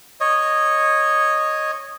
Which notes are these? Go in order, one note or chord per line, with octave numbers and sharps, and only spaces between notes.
C#5 D#5